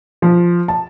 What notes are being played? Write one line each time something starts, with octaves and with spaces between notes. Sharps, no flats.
F3
A5